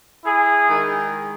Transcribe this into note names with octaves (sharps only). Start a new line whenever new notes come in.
E4 G#4
D#3 G#3 D#4